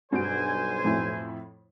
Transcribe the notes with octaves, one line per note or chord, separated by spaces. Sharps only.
B1 G2 F#4 C5 G#5 D7
F2 A2 E4